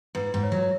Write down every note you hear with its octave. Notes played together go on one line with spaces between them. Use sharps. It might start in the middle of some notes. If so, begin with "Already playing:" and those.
G#2 B4
G#2
C#5
F#3